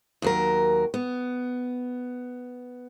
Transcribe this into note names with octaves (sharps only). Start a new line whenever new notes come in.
D#2 F#3 A#4
B3